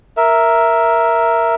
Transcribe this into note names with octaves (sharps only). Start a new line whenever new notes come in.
A#4 E5